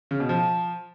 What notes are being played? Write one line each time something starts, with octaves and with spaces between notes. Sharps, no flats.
C#3
B2
F3